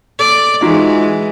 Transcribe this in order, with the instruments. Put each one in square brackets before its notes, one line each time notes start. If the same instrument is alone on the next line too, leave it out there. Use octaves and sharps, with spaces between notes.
[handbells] A4 [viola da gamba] D5
[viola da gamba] E3 G#3 [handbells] D#4 F4 F#4